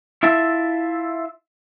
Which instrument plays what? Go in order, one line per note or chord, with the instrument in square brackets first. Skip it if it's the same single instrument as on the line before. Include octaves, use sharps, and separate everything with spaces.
[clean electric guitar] E4 F4 E5 A5